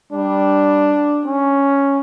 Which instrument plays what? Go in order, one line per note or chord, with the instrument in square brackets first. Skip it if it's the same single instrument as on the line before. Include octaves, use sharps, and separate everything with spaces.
[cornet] G3 [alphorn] D4
[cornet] C#4